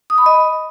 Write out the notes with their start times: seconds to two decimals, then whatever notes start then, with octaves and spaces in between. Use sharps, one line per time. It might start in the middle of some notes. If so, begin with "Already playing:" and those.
0.10 D#6
0.18 B5
0.26 D#5